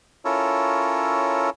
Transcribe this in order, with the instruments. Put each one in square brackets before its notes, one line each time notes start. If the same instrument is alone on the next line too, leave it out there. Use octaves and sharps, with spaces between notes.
[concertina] C#4 E4 F4 A4 A#4 C#5